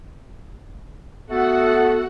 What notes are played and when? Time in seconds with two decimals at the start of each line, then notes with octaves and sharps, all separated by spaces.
1.30 A3 B3 F#4 A4 F#5